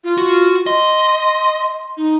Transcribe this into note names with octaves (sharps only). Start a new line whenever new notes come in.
F4
F#4
D#5 C6
D#4